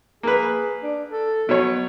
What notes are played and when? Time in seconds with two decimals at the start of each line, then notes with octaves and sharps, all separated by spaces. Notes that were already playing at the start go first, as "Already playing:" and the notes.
0.23 A#3 G#4 B4
0.83 D4
1.11 A4
1.49 B2 F#3 C#5